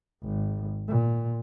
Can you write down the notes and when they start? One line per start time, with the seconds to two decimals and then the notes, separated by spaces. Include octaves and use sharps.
0.24 G#1
0.88 A#2